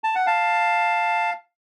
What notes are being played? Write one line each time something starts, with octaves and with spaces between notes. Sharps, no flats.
A5
F#5
F5 A5